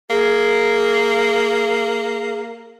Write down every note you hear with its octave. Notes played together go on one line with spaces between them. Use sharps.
A#3 G#4